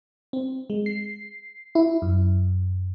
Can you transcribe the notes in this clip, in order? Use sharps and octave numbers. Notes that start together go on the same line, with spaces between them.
C4
G#3
C7
E4
F#2